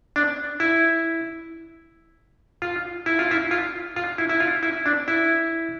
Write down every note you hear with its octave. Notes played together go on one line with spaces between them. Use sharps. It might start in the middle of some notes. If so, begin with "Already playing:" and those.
D4
E4
F4
E4
F4
E4
F4
F4
E4
E4
F4
E4
D4
E4